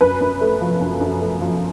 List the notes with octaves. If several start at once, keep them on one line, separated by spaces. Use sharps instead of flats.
F#2 B4
F#2
A3
F3
F#2
F#2
A3
F3